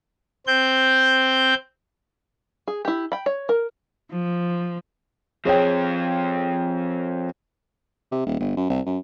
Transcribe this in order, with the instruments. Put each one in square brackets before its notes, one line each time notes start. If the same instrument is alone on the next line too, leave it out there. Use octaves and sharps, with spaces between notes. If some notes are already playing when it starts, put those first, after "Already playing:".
[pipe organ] C4 G6
[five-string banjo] G#4
E4 G4
G5 B5
C#5
A#4
[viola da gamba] F3
[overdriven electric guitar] F3 C4 [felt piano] G#4 C#5 G5
[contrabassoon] C3
D#1
G1
F#2
C2
F#2